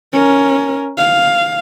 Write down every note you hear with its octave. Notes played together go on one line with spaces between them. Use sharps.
C#4 A#4
F5